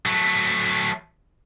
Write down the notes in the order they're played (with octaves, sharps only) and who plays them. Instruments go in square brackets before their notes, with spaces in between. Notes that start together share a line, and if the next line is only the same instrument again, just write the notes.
[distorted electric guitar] F#3 A3